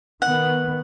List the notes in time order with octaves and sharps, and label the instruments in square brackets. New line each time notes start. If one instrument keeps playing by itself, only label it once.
[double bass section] D#3 B3 [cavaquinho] F#5